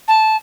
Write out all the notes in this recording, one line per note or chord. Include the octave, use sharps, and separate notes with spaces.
A5